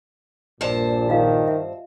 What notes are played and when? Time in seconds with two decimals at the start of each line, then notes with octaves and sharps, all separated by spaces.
0.61 A#1 G2 A#2 C5 A5
1.09 D#3 F4 D#5 F5
1.48 E5